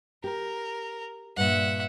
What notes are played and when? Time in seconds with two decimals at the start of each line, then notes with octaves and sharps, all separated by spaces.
0.24 G4 A#4
1.37 G2 A#2 E5 F#5